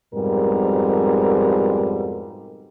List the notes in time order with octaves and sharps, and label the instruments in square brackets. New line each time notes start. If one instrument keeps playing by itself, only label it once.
[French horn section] F2 G#2 B2 G3 A#4